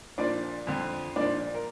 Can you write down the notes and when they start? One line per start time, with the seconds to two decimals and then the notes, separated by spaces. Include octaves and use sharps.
0.18 A#2 F3 D4 D5
0.67 F2 D3 F3
1.16 A#2 F3 D4 D5
1.55 A#4